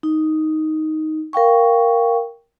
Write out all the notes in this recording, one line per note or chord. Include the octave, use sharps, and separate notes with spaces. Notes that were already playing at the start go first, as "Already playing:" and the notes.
D#4
A#4 F5 G5 C#6